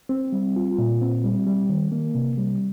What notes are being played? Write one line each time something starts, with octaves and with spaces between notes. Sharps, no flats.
C4
G3
F4
A#2
C4
G3
G3
D#3
A#3
C3
G3